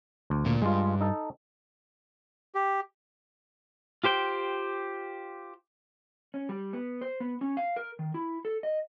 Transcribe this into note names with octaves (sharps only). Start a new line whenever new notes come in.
D2
A#2
G2 G#3 F4
D#4 A4
G4
F4 G4 C5 G5
C#4
G3
B3
C5
B3
C#4
F5
A#4
D#3
E4
A4
D#5